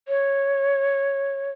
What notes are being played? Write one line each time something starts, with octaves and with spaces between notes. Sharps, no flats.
C#5